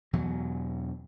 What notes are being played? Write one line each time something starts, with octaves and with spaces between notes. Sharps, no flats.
E2 B2 E3 F#3